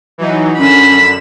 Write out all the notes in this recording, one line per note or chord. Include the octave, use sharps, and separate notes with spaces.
E3 F#3 D#4
F#2 D3 C#4 B5 E7